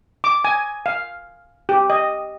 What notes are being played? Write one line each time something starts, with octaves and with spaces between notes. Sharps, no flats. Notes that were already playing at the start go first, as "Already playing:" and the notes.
D6
G#5
F5
G4
D#5